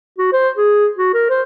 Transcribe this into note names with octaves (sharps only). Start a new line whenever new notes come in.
F#4
C5
G#4
F#4
A#4
C5